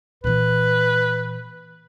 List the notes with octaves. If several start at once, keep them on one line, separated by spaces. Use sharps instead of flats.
A#2 E3 B4